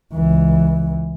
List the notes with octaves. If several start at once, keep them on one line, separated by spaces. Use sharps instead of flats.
C#2 E3